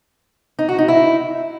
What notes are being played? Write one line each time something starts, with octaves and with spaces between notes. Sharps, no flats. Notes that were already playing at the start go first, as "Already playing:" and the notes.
D#4
F#4
D#4
E4